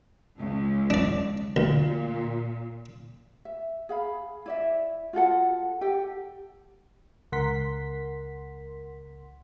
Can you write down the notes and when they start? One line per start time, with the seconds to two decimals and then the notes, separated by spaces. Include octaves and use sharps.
0.39 C#2
0.90 D4 D5
1.56 D2 A#2
3.45 E5
3.89 G#4 F5 B5
4.46 E4 D5 E5
5.13 F4 F#4 A4 F#5
5.81 G4 A4 G5
7.32 C#2 A#4 F#5 C6 B6